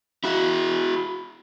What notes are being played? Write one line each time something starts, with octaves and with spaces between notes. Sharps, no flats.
E4 F#4